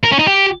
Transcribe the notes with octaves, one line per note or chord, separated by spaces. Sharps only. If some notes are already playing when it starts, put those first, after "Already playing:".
A#4
C#4
D#4
G4